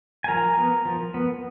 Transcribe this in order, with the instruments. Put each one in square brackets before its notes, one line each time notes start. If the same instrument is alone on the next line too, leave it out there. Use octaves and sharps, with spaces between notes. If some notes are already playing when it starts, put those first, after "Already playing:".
[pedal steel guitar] G#5
F3 A#4 A#5
B3
F3
B3